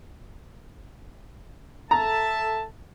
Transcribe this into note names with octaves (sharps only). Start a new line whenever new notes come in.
A4 E5 A5 A#5